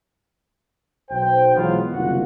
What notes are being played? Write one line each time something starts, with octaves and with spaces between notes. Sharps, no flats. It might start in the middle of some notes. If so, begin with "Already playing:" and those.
B1 C5 G5
B2 E3 F#3 G#3 B3 F4
F#1 C2 D#3 F4 F#4 F#5